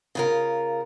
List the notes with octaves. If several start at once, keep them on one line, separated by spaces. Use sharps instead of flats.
C#3 F4 A#4